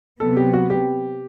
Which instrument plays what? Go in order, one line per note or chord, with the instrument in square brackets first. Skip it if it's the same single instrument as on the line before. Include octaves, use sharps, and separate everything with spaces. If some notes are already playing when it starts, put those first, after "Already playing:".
[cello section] C3 F#3 B3 [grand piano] A4
[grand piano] G4
F#4
G4